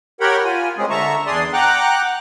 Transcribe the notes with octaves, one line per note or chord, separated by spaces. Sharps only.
G4 A#4 C#5 F#5 G5 B5
F4 G#5
G#3 A#3 C4 C#4 G#4
D3 E5 A5 A#5 C#6
E2 D4 G#4 D5 C6 D#6
F#5 G5 A#5 D6 F#6